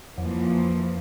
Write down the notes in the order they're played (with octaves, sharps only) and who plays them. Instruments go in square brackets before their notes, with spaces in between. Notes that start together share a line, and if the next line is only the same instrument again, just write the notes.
[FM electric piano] F2 [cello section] E3 F3 A#3